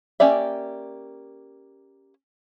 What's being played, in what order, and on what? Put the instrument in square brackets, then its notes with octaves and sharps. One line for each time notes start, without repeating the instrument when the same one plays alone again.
[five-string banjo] A#3 C#4 G4 D5 E5